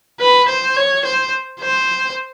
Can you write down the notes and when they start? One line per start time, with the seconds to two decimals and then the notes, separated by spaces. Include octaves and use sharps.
0.20 B4
0.48 C5
0.76 C#5
1.05 C5
1.61 C5